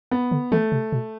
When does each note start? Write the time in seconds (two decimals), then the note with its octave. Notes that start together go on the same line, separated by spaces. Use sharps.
0.11 B3
0.32 D3
0.52 E3 A3
0.72 C3
0.92 B2